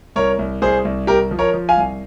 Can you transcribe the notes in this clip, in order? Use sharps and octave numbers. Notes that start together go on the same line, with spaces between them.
C2 A#4 C#5
C2
C2 G#4 C5
C2
C2 G4 A#4
F3
A#4 C#5
F3
F5 G#5
C2